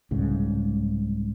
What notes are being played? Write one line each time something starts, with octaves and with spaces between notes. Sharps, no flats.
C2 G#2 C#3